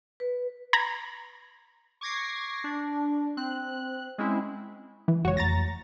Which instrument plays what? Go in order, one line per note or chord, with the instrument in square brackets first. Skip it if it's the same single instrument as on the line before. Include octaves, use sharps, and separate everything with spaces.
[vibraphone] B4
[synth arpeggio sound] A#5 B5 G#6 A#6
[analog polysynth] C#6 D6 G#6 A#6 C7
D4
C4 F#6
G#3 C4 C#4 E4
[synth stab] E3
[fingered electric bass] F#1 G#3 [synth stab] F#4 C#5
[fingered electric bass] F2 A3 [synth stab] A#5 A6 A#6